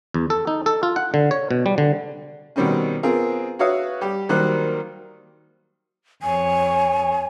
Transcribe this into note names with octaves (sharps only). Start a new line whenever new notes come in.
E2
A4
D#4
A4
F4
F#5
D3
C#5
B2
G3
D3
B2 D#3 G3 C4 C#4
B3 C4 F4 G#4 A#4
F#4 B4 C#5 E5 F5 D#6
G3 G4
D#3 F#3 G3 A#3 C5 F#6
F2 C#5 G#5